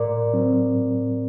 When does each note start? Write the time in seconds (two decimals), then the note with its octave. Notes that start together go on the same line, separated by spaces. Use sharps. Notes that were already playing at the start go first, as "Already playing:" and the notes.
Already playing: A2 A#4 D5
0.34 F#3 C4
0.75 A2